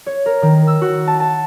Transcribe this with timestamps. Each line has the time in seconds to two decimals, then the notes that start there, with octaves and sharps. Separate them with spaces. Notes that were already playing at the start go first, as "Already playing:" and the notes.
0.06 C#5
0.26 A#4
0.42 D#3
0.67 E6
0.81 F#4
1.07 A5
1.20 A5